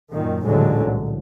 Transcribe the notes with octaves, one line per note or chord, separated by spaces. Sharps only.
F#2 A#2 D#3
A1 D#2 A#2 D3 F#3 G#3
C2